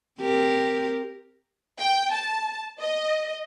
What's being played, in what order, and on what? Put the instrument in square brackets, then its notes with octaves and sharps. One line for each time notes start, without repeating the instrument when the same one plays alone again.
[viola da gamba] C4 G4 A#4
[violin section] G5
A5
D#5